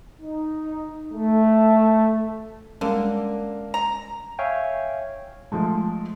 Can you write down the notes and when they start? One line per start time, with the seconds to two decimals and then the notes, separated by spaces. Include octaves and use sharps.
0.20 D#4
1.12 A3
2.81 D3 G3 G#3 A#3 C#4
3.74 A#5
4.39 C#5 E5 F5 G5 G#5
5.52 F3 G#3 A3